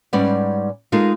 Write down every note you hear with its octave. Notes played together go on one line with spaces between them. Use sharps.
G#2 G3 C#4 B4 D5 F#5
G#3 D#4 F4 A4 A#4 F5